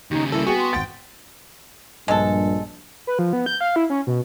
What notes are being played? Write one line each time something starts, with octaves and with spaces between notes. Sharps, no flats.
D#2 C#3 D#4 G4
G3 A#3 E4 A4
B3 F#4 G#4 G5 G#5
C6
G#1 F#5 G5 A6
A#1 G2 G#3 A4
B4
F3
B3
G6
F5
E4
C#4
B2